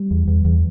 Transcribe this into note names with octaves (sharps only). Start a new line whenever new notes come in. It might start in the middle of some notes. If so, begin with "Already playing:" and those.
Already playing: G3
E2
E2
E2